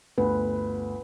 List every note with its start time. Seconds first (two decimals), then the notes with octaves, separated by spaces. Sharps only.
0.18 G1 D2 B4